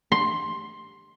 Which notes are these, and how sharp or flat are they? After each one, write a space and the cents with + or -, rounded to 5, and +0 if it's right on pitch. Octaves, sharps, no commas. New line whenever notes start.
C6 +10